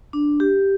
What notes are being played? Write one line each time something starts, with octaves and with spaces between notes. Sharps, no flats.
D4
G4